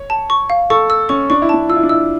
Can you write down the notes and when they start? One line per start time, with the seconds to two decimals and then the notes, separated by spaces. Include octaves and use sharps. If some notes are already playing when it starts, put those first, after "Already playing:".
Already playing: C#5
0.10 A5
0.30 C#6
0.50 F5
0.70 A4 C#6
0.90 E6
1.09 C#4 C#6
1.30 D4 C#6
1.42 E4
1.49 D4 A5
1.69 F4 E6
1.76 E4
1.83 D4
1.89 E4 E6